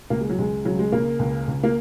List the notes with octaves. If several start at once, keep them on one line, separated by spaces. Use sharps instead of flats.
C#2 A#3
G#3
F#3
C#2 G#3
C#3 F#3
G#3
C#3 A#3
C#2
C#2
A#3